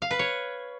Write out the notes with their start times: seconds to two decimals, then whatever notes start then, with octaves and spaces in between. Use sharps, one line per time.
0.02 F5
0.11 B4
0.19 C#5